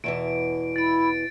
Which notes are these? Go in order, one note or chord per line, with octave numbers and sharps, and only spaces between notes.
E2 B2 E3 D7
E4 A6 D7